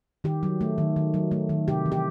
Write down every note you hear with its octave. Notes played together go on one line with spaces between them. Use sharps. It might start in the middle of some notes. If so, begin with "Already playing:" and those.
D#3 G4
F#3
A3
D#3
D#3
F#3
A3
D#3
C3 G4
E3
G4